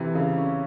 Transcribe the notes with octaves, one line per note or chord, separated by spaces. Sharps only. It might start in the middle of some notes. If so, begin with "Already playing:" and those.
Already playing: C3 E3
C#3
C#4